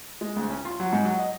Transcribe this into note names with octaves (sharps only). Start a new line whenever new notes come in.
G#3
D2
C#4
F4
F#3
G#2
F#3
D#5